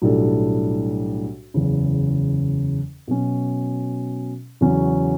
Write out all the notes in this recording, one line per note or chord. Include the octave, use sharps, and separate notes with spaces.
B1 A2 G3 D4 A4
F#1 E2 C#3
B2 F#3 C#4
E2 C#3 F#3 C#4